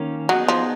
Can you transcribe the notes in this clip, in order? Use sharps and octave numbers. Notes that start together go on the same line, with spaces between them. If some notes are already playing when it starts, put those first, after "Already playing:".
Already playing: D#3 A#3 C#4
F#3 B3 D#4 G#4
F3